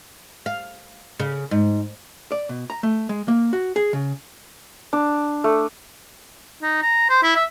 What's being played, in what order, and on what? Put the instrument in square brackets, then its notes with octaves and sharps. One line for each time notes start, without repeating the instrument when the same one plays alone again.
[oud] F5
C#3
G#2
[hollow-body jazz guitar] D5
B2
A#5
A3
G#3
A#3
F#4
G#4
C#3
[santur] D4
A3
[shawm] D#4
A#5
C5
E4
E5